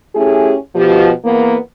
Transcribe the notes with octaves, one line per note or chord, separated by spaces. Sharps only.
A3 C#4 E4 G4 G#4
B2 F3 G4
E2 A#3 B3